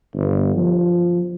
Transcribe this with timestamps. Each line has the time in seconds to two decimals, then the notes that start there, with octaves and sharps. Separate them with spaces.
0.16 G1
0.55 F3